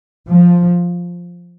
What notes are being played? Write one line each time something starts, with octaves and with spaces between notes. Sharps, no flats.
F3